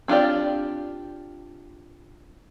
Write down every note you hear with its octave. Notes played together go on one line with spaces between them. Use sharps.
C4 D4 F4 G4 D5